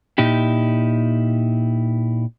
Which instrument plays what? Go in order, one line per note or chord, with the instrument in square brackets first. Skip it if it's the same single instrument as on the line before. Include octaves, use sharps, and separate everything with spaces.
[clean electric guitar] A#2 D#4 E4 G4